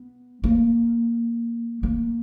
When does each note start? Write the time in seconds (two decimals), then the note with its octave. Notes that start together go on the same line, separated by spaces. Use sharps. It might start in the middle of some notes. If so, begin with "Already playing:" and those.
Already playing: B3
0.44 A#3
1.83 A#3